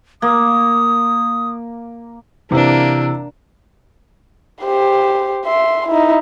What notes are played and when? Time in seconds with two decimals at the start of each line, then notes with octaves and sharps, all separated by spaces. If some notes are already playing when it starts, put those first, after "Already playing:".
0.22 A#3 D#6
2.51 C3 E3 A#3 D4
4.62 G4 C5
5.46 E5 C6
5.88 D#4 E4